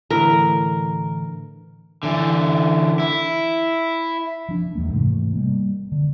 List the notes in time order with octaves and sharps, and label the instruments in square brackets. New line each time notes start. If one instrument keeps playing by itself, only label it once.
[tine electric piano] A2 D3 E3 [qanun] A#4
[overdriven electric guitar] D3 E3
E4
[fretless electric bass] F3 D4
E2 G#2 G#3 A#3
G#2 C3 E3 A3
G3 G#3 A#3
D3